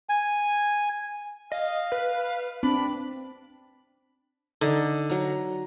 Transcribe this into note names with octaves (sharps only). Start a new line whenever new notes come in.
G#5
D#5 F5
B4
C4 D4 B5
D3 D#4
F#3 A#5